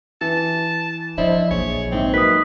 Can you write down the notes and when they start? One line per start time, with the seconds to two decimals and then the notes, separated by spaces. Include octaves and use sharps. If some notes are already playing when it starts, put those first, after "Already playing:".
0.21 E3 A5
1.18 F3 C#4 D4 E4 C5 D#5
1.51 A#1 F#3 G#4 C#5
1.92 G#1 C4 D#4 E5
2.14 F#3 A#3 D#4 B4 D#6 B6